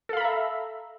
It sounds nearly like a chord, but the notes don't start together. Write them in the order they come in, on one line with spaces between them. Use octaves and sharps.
A4 F5 B5 A#5 E5